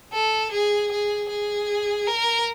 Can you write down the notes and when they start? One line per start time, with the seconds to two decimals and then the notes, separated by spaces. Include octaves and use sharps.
0.13 A4
0.52 G#4
0.91 G#4
1.29 G#4
2.07 A#4